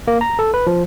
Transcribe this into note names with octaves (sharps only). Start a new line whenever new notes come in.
A#3
A#5
A4
B4
F3